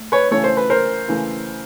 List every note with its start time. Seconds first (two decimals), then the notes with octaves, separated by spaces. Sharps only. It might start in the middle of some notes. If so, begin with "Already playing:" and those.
Already playing: A3
0.12 B4 C#5
0.31 C#3 E3 A3 C#5
0.44 C5
0.57 B4
0.70 A#4 C5
1.08 C#3 E3 A3